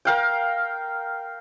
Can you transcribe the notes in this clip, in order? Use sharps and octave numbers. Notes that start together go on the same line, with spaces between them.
A#4 F5 G5